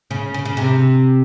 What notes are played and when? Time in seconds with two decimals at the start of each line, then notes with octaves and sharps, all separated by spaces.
0.11 C#3
0.34 C#3
0.45 C#3
0.57 C3